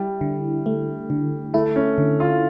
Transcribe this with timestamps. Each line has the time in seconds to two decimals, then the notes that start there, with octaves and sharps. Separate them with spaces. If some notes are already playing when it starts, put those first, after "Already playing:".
Already playing: G3 E4
0.21 D3
0.66 A3
1.10 D3
1.54 A3 E4
1.76 C#4
1.98 D3
2.20 F4